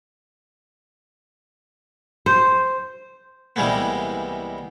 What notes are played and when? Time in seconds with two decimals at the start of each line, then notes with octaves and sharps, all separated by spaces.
2.26 C5
3.56 C2 E3 G3 G#3 A#3 B3